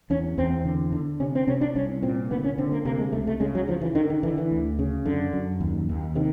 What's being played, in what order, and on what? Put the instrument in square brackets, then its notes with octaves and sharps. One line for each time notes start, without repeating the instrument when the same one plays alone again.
[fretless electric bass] E2 C#4
E2 C4
D3
D3
C3 C#4
C4
C3 C#4
D4
C2 C#4
A#2 C4
D3 B3
C#4
D3 C4
A#3
C3 A#3
G#3
C#2 A3
A3
C#3 G#3
F#3
C#3 F3
E3
D3 D#3
D#3
D3 E3
E3
D2
C#3
F#2 D3
F#2
D#2
D#2
C3 D#3